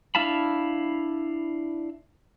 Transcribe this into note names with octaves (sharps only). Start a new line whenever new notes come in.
D4 E4 F5 A5 B5